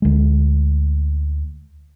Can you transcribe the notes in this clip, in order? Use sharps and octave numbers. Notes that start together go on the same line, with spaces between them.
D2 G#3